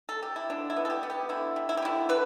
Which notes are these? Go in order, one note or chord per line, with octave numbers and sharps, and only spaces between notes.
A4
G4
E4
D3 D4
E4
B3
A4
G4
B3
G4
D3 E4
G3
E4
G4
D3 E4
D3 B4